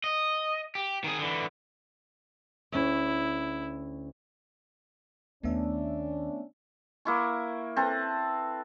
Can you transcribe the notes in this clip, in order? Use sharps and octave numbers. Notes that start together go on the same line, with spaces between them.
D#5
G4
D#3 G#4
D3 E3
D2 C#4 E4
D#2 D#3 A3 B3 C#4 D4 E5
A#3 E4 C#6
C4 A4 B4